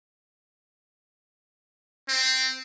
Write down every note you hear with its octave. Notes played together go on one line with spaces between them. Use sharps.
C4